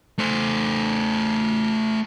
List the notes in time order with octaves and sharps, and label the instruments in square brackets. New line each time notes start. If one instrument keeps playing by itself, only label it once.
[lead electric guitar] A3 C5